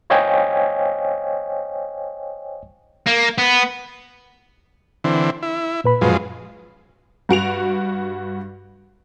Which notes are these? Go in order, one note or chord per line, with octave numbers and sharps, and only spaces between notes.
C5 C#5 D#5 F5 G5 G#5
A#3
B3
D3 E3 C4
E4
A#2 B4 B5
F#2 F3 G#3
G2 F#4 D7 F7